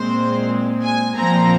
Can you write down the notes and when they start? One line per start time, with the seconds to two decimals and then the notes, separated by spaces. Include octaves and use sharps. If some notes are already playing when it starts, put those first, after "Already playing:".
Already playing: A#2 G#3 C4 C5
0.84 G#5
1.17 A#2 F3 C4 A#5